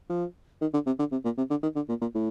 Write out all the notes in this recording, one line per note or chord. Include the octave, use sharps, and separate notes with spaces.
F3
D#3
D3
C3
D3
C3
A#2
C3
D3
D#3
D3
A#2
A#2
A2